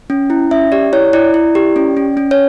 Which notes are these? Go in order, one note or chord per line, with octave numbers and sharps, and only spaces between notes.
C#4
E4
C#4 E5
G4 D5
E4 C#5
E4 D5
E4
G4
C#4
C#4
C#4
C#5